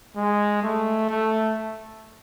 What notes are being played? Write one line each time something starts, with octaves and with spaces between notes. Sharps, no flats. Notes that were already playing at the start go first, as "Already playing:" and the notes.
G#3
A3
A3